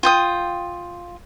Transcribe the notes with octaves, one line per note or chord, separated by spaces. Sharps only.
F4 G5 D#6